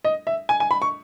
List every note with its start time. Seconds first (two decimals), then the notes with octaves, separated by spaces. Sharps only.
0.05 D#5
0.27 E5
0.49 G#5
0.60 G#5
0.71 B5
0.82 C#6